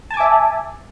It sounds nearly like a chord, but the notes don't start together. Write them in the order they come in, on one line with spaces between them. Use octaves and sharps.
A5 G#5 D6 E5